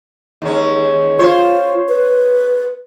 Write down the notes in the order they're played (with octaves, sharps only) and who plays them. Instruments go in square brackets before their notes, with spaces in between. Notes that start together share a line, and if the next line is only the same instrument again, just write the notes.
[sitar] D#2 G#3 C#4
[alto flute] F4 [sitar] C5 C#5
[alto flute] B4